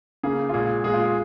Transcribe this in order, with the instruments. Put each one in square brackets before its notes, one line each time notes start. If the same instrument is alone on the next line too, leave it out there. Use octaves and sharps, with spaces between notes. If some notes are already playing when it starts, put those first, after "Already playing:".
[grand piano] C#3 A#3 G#4
F4
A#2 G#3 G#4
A#2 G#3 G#4
F4
G#4